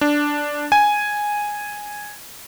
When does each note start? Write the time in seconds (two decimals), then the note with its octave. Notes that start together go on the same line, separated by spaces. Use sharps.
0.01 D4
0.72 G#5